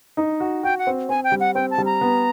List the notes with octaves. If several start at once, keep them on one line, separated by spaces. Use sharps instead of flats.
D#4
F#4
F#4 G5
F#5
C4
C4 G#5
G5
G3
F#5
C4 G5
A5
G3
A#5
B3